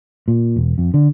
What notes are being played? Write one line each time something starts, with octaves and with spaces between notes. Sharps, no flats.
A#2
E1
F2
D3